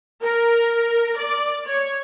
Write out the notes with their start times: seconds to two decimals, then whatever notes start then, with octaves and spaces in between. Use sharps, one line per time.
0.22 A#4
1.17 D5
1.66 C#5